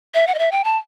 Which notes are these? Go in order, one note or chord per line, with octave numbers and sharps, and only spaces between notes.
E5
F#5
D#5
E5
G5
A5